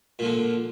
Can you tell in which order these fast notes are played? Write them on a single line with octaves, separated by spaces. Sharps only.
A#2 F3 D3